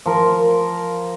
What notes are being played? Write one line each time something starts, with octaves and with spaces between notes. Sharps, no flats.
F3 A#4